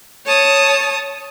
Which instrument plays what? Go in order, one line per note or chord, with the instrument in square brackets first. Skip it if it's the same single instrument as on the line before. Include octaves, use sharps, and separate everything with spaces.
[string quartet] C#5 A5 D#6